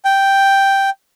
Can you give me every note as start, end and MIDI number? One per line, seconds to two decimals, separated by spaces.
0.05 0.90 79